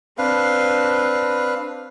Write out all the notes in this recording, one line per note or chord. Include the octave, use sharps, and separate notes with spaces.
C4 D4 B4 F5